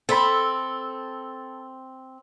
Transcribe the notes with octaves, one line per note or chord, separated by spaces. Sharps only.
C4 A4 B5